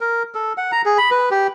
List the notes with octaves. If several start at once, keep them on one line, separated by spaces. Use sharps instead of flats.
A#4
A4
F#5
A#5
G#4
B5
B4
G4